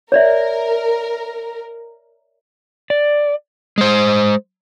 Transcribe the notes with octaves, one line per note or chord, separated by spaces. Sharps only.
A#4 C#5 D5 E5
D5
G#3 C5